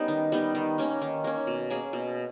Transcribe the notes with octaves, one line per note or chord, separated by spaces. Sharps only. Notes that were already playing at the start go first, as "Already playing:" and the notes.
Already playing: G3 B3 C#4 D#4
D#3
G3 B3 D#4
D#3
A#3 C#4
D#3
A#3 C#4
B2
A#3 C#4 G#4
B2